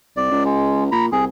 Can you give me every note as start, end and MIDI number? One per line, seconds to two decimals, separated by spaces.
0.17 0.27 36
0.17 0.44 74
0.31 0.90 37
0.45 0.84 56
0.92 1.07 46
0.92 1.06 82
0.92 1.06 83
1.12 1.26 36
1.12 1.25 68